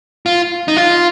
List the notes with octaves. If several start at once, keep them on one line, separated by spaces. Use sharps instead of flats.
F4
D#4
F4